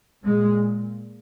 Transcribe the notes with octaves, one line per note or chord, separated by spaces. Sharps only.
A#2 G#3